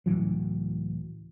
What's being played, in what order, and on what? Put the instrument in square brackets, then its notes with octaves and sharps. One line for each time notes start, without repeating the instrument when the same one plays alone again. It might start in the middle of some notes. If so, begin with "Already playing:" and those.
[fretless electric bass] C#2 A2 E3 F#3